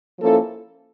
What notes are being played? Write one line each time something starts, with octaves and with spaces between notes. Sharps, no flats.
F3 A#3 C#4 E4 A4